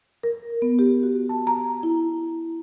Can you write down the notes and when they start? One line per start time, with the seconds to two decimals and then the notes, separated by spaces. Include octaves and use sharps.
0.23 A#4
0.62 B3
0.79 G4
1.03 F#4
1.29 A5
1.47 A#5
1.83 E4